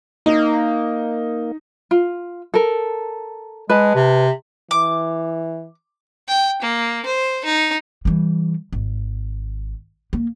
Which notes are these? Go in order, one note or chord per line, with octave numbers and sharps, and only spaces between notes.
A#3 D#4
F4
A4 A#4
G#3 B4 A5
C3
E3 D6
G5
A#3
C5
D#4
E3 G3
G#1
A#3